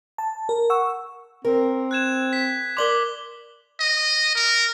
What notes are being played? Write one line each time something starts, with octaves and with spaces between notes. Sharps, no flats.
A5
A#4
F#5 C#6 E6
C4 A#4
F#6 G#6 E7
B6
A#4 D5 C6 D6 F#7 G7
D#5
A#4